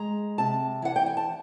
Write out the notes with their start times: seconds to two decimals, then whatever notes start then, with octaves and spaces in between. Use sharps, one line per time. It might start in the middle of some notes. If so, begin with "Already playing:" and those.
Already playing: G#3 A#5
0.38 C3 A5
0.82 E3 F#5
0.96 G5
1.06 G#5
1.17 A5